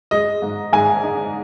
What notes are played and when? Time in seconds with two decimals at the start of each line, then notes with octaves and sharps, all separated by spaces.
0.11 G#3 D#5
0.42 G#2
0.73 G#2 G#5
1.03 D#4